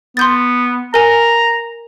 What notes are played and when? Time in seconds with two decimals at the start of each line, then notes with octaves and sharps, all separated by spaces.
0.17 B3 C6 G6 A6
0.94 A#4 G#5 A#5